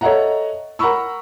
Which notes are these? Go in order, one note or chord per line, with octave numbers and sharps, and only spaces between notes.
A4 C#5 D#5 E5 F#5 A#5
A#4 F#5 A#5 B5 C#6 E6